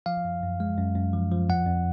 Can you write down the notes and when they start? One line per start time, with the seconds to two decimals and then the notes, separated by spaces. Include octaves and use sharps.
0.06 F3 F5
0.25 F#2
0.43 F#2
0.60 G#3
0.77 F#2
0.95 F#2
1.13 F3
1.32 F3
1.49 F2 F#5
1.67 F2